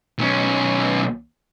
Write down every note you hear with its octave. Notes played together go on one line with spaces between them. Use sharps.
B1 C#4